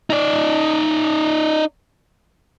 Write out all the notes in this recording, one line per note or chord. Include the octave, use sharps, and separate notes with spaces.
D#4 D5